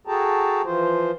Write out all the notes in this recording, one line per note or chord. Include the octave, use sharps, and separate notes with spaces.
F#4 G#4 A4 G5 A5 A#5
E3 F3 F4 C5